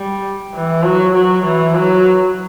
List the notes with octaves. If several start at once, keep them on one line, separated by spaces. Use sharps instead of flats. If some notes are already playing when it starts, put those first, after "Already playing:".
Already playing: G3
E3
F#3
F#3
E3
F#3